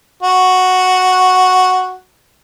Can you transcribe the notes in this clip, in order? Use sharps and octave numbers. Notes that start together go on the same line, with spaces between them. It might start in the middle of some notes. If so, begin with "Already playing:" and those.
F#4